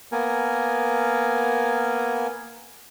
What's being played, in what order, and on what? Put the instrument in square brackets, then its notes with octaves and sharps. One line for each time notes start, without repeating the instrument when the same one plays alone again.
[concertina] A#3 B3 A#4 G#5